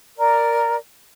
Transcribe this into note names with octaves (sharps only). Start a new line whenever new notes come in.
A#4 D5